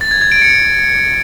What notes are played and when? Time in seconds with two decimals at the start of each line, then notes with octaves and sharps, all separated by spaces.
0.01 A6
0.11 G#6
0.21 G#6
0.32 D7
0.42 C#7